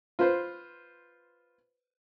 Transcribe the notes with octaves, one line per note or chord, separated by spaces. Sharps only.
F4 B4 C5